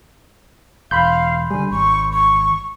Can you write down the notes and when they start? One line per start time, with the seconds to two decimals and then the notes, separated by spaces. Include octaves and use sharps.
0.91 E1 F5 B5 C6 G6
1.51 D3 G3 G#5
1.71 G#1 C#6
2.13 C#6